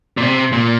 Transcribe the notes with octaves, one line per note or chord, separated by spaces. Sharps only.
A#2
C3
A#2